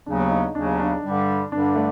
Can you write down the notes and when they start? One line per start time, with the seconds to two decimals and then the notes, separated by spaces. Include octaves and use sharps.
0.06 D#2 C#3 F#3 B3 D4
0.31 D#4
0.55 D#2 C#3 F#3 B3 D4
0.79 D4
1.03 G2 D3 G3
1.51 G2 D3 G3 D4
1.76 A3